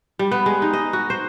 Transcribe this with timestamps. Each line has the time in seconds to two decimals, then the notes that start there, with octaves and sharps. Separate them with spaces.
0.19 G3
0.31 B3
0.46 G#3
0.62 D#4
0.73 D#5
0.93 F#4
1.10 C5